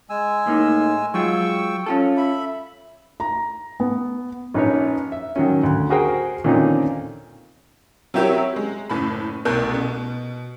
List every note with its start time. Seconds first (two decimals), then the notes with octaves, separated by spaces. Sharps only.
0.10 G#3 G#5 E6
0.47 A2 A#3 D#4
1.14 F#3 G#3 F4 G5 C#6 E6
1.86 C#4 F4 A4
2.17 E5 B5
3.20 A#5
3.80 B3
4.54 A#1 C#4 D#4 B4 C#5
5.12 E5
5.36 D#3 F#3 C#4
5.63 D2
5.90 F#4 G#4 A#4 C5 G5
6.44 A#2 D3 D#3 C4 C#4 D#4
8.14 F#3 C4 E4 G4 A#4 C#5
8.56 G#3
8.90 F#1 A2 B5
9.45 C2 B2 A3 A#4 F#6 G6
9.74 B2